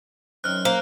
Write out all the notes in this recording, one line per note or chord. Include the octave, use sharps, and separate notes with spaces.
F#2 D#3 C4 F6 F#6
A#3 C5